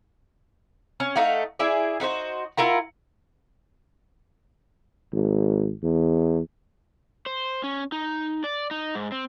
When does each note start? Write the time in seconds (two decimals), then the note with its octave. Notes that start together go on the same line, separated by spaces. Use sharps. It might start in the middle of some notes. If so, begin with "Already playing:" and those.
1.00 C#4
1.16 A3 D#4 F5 F#5
1.59 E4 G#4 D5
2.00 D#4 F#4 B4 C5
2.57 E4 F4 A#4 F#5
5.13 G#1
5.84 E2
7.26 C5
7.64 C#4
7.92 D#4
8.44 D5
8.71 D#4
8.95 G#2
9.12 C4